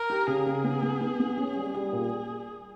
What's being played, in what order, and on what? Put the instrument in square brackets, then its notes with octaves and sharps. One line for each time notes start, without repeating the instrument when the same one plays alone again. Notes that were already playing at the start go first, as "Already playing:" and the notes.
Already playing: [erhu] A#4
[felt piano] G4
[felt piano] C#3 [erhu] G#4
[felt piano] C#3
B3
B3
B3
B3
C#4
G3
[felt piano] G3 [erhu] G#4
[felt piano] A#2